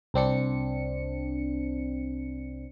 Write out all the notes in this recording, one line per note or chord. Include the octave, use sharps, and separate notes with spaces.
C2 C4 D4 C#7